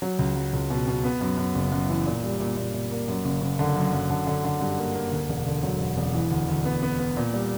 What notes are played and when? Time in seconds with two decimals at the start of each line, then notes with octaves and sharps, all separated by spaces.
0.02 F#3
0.19 C#2
0.36 F#3
0.53 C#2
0.70 B2
0.87 B2
1.04 B3
1.21 F#2
1.37 F#2
1.55 F#1
1.72 F#2
1.89 E3
2.06 A#2
2.23 G3
2.40 A#2
2.57 A#2
2.74 A#2
2.91 A#3
3.08 F#2
3.25 F#1
3.42 F#1
3.59 D3
3.76 F#2
3.93 F#2
4.10 D3
4.27 D3
4.44 D3
4.61 G2
4.78 A#3
4.95 A#3
5.12 D2
5.29 E1
5.46 D3
5.63 F#3
5.80 E1
5.97 E1
6.14 E3
6.31 D2
6.48 D2
6.65 B3
6.82 B3
6.99 B3
7.16 A#2
7.33 G3